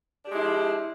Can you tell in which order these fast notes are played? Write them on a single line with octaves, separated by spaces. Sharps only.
D4 G4 G#3 E4 F3